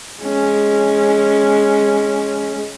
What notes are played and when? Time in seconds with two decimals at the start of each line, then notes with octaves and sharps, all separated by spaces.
0.21 G#3 C#4